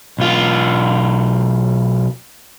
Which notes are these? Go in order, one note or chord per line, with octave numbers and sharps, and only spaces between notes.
B1 F4